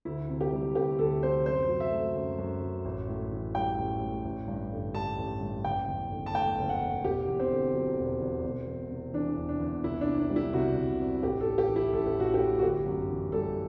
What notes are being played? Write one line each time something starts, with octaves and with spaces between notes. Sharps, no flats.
D2 E4
C3
G4
G3
D2 G4
D2 A4
C3 C5
F#2 C5
F#3
E5
A3
F#2
F#2
F#3
A1
A2
E3
G3 G5
A1
A2
A1
G2
D3
G3 A5
A1
G2
F#1 G5
E2
D3
A5
A3 G5
F#1
F#5
E2
E1 G4
E2
C4
D3
F#3
E1
E2
E1
E2
C3
E3 D4
E1
D4
E2
C2 E4
D4
C3
D4
G3
E4
C2 F#4
C2
C3
A1 G4
A4
A2
G4
E3
E4
A1 A4
G4
A1 F#4
G4
A2
F#4
G1 G4
F#2
E3
G3 A4